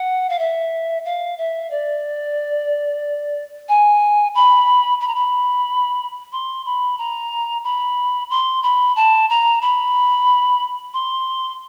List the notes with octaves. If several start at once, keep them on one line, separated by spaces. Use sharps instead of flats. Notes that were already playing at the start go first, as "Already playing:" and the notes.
Already playing: F#5
F5
E5
F5
E5
D5
G#5
B5
B5
A#5
B5
C6
B5
A#5
B5
C6
B5
A5
A#5
B5
C6